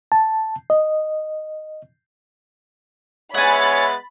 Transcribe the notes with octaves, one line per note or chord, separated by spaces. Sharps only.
A5
D#5
G#3 B3 C#5 E5 F#5 G#5 B5 A6